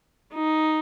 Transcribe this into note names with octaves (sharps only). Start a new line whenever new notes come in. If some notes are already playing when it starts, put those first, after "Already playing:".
D#4